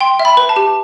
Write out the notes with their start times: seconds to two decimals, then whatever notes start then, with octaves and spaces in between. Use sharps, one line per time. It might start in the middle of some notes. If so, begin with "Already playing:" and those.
0.01 G5 C6
0.19 E5
0.25 B5
0.37 B4
0.49 A5
0.56 G4